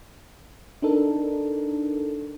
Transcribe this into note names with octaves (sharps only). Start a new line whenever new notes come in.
D4 D#4 A4 A#4